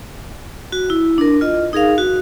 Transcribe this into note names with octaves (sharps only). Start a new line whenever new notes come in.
F#4
E4
D4 A#4
F4 D#5
D#4 G#4 A#4 F5
F#4